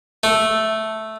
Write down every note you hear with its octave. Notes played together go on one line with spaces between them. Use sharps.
A3